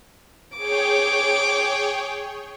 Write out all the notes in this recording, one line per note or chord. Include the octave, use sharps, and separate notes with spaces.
G#4 C#5 G5 D6